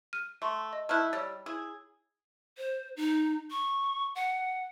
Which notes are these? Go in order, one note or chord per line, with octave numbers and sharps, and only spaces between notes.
F6 D#7
A3 C6 C#6
D#5
A3 E4 A5 F6 F#6
G3 C#5 E6 A6
E4 G#4
C5
D#4
C#6
F#5